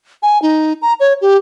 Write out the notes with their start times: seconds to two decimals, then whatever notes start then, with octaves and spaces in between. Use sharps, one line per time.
0.23 G#5
0.42 D#4
0.82 A#5
1.00 C#5
1.21 G4